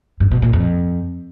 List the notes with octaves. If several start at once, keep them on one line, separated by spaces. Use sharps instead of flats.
G2
B2
A#2
F2